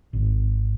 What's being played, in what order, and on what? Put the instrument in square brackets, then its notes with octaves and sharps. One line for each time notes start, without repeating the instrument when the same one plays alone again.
[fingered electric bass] G#1